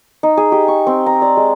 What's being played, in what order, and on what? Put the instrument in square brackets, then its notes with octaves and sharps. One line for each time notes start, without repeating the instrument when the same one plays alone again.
[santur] D#4
G#4
G4
C#6
C4
A#5
D5
G#3